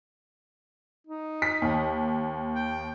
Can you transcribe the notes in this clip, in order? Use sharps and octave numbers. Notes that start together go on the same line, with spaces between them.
D#4
B6
D#2
G5